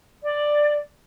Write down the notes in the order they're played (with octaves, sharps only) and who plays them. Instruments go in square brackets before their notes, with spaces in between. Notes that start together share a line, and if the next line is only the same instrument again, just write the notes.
[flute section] D5